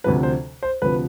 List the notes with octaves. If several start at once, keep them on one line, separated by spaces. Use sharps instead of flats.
D2 C3 F3 B4
C5
C5
D2 C3 F3 B4